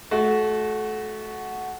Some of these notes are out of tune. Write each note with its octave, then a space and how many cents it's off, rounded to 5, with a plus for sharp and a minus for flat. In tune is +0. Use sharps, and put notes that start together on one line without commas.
A3 -30 F#4 +0